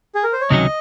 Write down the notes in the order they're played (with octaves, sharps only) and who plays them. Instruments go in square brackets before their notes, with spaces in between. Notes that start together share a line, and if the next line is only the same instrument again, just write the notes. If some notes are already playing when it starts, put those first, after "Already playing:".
[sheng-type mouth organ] G#4
A#4
C5
C#5
[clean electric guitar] C#2 C3 D#3 F#3 C#4 [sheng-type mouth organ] D#5